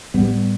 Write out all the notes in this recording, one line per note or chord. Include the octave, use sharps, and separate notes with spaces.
A2 G3 B3